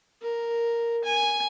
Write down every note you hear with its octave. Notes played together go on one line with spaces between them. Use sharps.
A#4
G#5